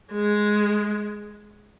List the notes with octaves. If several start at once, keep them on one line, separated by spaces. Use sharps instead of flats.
G#3